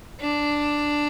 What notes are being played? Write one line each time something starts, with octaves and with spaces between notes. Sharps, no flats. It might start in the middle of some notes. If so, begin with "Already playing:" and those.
D4